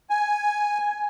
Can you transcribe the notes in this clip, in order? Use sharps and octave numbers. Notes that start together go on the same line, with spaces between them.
G#5